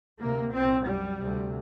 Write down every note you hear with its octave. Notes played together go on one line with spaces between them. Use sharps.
D2 C3 A#3
C2 A#2 C4
F#2 G3
D2 C3